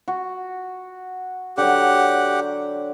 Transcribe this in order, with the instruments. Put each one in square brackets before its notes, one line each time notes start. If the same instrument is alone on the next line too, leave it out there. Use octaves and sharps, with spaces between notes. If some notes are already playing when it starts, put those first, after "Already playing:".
[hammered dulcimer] F#4
[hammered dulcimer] D3 F#3 [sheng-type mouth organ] G4 F#5